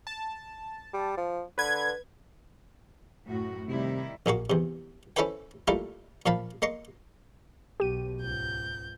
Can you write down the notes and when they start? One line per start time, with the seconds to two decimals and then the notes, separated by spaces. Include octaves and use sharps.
0.07 A5
0.93 G3
1.17 F3
1.58 D3 B4 G#6
3.26 F#2 A2 F#4
3.68 C3 D#3 G3 E4
4.26 A#1 A#2 A#3 F#4
4.50 E2 C3
5.16 C#4 E4 A4 B4 C5 G5
5.68 G3 A3 A#3 E4 F4
6.26 A#2 F3 F5 A5 B5
6.62 A#3 D#5 C6 C#6
7.80 B1 G4 D#7
8.21 C#2 G#2 G6